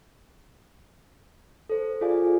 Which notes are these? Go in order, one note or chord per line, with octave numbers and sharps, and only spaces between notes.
A4 C5
F4 G#4 A4 D5 F5 G#5